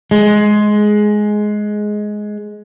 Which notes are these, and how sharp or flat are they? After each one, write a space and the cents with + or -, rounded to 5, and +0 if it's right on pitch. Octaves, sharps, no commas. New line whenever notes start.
G#3 +10